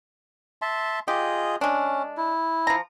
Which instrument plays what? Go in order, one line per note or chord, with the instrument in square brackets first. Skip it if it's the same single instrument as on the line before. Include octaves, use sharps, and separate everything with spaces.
[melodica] E5 A5 C6
[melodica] F4 G#4 D#5 [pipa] G4
[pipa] G#3 D4 [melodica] C#4
[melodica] E4
[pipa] F3 A#5